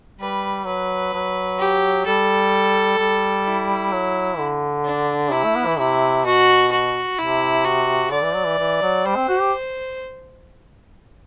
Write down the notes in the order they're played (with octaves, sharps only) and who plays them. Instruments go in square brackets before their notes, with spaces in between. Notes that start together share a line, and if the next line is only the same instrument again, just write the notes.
[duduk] G3 [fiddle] B4
[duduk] F#3 [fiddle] B4
[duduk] F#3
[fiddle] G4
[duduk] G3 [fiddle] A4
[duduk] G3
[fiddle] E4
[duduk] F#3
D3
[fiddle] D4
[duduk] C3 [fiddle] E4
[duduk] A3
B3
E3
[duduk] C3 [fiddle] E4
[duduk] B2 [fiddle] F#4
[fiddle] F#4
[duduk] C3 [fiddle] E4
[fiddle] F#4
[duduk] D3 [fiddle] D5
[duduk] E3
F#3
E3
E3
F#3
[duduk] G3 [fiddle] C5
[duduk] C4
F#4
G4